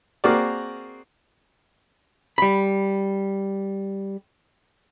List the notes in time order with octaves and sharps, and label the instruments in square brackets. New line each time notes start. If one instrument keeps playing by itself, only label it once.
[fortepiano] A#3 C4 F#4 G#4 A#4 D5
[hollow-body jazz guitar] G3 B5